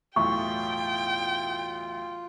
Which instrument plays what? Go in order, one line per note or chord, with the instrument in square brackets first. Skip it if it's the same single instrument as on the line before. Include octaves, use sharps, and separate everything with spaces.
[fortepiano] B1 E2 A2 [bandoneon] F4 [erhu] G5 [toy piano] C#6